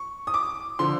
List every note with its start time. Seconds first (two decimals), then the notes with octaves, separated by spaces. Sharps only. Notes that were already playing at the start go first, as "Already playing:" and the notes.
Already playing: C#6
0.27 D#6
0.34 D6
0.79 D3 F3 C6